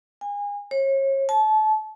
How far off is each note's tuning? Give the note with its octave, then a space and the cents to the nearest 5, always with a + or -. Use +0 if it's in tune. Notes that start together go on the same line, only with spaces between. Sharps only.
G#5 -30
C#5 -35
A5 -30